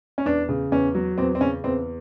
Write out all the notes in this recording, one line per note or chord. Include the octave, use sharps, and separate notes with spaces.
C#4
E2 D4
C#3
E2 C#4
F#3
E2 C4
C4
C#3 C#4
E2 C4